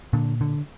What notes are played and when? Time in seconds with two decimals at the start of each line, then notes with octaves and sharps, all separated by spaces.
0.13 A#2 D3
0.41 D3